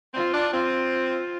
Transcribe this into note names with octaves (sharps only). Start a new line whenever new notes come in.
C4 F4
D4
C4 F4